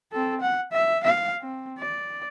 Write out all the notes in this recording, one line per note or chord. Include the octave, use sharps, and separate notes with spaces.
C4 A4
F#5
E5
F5
C4
D5